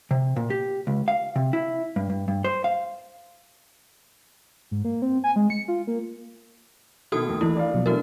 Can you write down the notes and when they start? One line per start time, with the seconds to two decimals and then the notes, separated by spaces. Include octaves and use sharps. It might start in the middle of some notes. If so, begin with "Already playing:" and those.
0.11 C3
0.36 A#2
0.50 G4
0.87 C#2
1.08 F5
1.36 C3
1.53 E4
1.96 G2
2.10 G2
2.28 G2
2.44 C5
2.64 F5
4.71 G#2
4.85 A#3
5.02 C4
5.24 G#5
5.36 G#3
5.50 C#7
5.68 F4
5.87 A#3
7.12 B2 D#3 B3 F#4 A4 D#6
7.25 D#2 A3
7.41 E3 A#3 E4 B5
7.57 D5 F5
7.74 B2 F3 F#3
7.86 E3 A3 D4 F#4 A#4